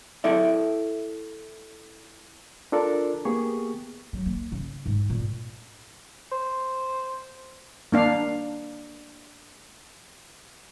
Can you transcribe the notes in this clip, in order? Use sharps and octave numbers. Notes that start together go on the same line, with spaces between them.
E4 A4 D5 E5
D4 F4 A4 A#4 D5
A#3 B3 G4 G#4 C#6
F#3
A#3
C#3
G#2
A#2
C5
A#3 D4 F5